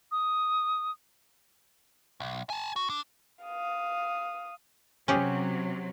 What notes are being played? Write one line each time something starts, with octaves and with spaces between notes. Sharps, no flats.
D#6
B1
G#5 A5
F#4
D4
F5 D#6
C3 F#3 C#4 G4 G#4